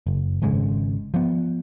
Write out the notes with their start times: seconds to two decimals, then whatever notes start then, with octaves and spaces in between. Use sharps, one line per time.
0.07 F#1
0.42 G#1 G#2 C#3 G#3
1.14 F3 B3